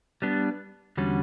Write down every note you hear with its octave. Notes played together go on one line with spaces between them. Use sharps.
G3 B3 D4
E2 D3 G3 C#4 F#4